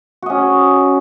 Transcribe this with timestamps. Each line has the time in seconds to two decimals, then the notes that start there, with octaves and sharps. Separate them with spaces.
0.22 F#4
0.26 D#5
0.30 C#4